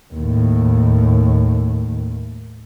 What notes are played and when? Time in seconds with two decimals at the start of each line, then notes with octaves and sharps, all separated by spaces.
0.14 D#2 A2